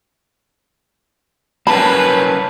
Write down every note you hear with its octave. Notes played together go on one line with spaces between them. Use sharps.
A#3 C#4 B4 A5 B5